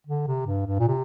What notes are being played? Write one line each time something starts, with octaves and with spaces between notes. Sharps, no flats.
D3
C3
G2
G2
A#2
C3